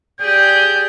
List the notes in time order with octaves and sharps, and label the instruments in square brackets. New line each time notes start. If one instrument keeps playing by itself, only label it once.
[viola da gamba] G4 G#4 D5 [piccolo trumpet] G6